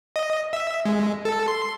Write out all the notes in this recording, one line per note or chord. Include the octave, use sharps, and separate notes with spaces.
D#5
E5
G#3
A4
C6